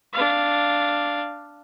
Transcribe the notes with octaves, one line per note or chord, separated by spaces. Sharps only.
D4 F5